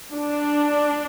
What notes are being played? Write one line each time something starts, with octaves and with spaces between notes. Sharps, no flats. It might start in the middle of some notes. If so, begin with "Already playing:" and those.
D4